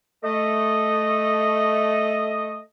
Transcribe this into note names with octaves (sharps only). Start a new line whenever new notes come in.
A3 D#5